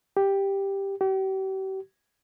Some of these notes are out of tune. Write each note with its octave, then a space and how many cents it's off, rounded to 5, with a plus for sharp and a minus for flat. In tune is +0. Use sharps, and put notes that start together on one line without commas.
G4 +5
G4 -40